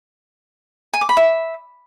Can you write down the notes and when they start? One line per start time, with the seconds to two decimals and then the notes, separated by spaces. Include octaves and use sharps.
0.94 G#5
1.01 D6
1.09 B5
1.17 E5